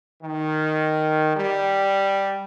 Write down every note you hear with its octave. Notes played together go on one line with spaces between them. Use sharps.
D#3
G3